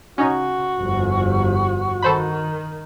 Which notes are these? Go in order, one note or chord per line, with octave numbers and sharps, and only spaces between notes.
C#3 C#4 D#4 F#4
G1 F2
D#3 A4 C5 B5